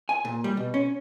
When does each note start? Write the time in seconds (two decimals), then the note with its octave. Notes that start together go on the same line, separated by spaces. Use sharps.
0.09 G#5
0.25 A#2
0.44 G3
0.57 B2
0.74 C#4